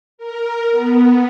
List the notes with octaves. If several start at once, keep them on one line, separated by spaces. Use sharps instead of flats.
A#4
B3